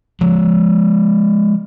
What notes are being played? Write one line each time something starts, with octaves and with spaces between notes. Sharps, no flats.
F3 G#3